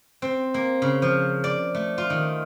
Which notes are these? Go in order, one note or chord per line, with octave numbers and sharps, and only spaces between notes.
C4
A#3
C#3
F3
D5
A3
F4
D#3